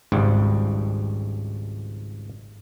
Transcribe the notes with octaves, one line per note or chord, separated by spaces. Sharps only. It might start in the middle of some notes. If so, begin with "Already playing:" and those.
G#1 C#2 G#2 G3